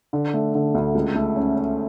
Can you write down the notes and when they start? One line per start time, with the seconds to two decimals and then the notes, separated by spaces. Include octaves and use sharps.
0.13 D3
0.34 A3
0.55 D3
0.75 D2
0.95 C#2
1.15 A3
1.36 C#4
1.56 C#4